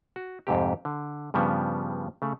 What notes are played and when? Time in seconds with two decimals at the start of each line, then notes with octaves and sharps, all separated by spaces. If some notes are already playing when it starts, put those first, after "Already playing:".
0.16 F#4
0.47 F2 G#2 C3 G4
0.85 D3
1.34 G2 C#3 F3 G3 B3
2.22 C#3 A3